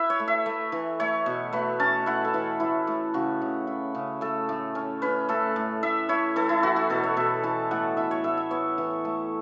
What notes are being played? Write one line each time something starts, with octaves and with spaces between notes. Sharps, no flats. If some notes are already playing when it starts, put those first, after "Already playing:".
Already playing: E4 B4 E5
C#5
A3
E5
A3
E3
A3 C#5
B2
A3 B4
C#4 A5
E4 F#5
A4
E3
A2 E4
A2
C#3 F#4
C#3
E4
C#3
A3 A4
A2
C#4
C#4 B4
A3 A4
A2
A2 E5
E4 C#5
E3 A4
E4
E3 F#4
F#4
B2 A4
C#5
B2 E5
E3 A5
A2 F#5
E4 E5
C#5
A2 E5
E5
B3 C#5
E3
A3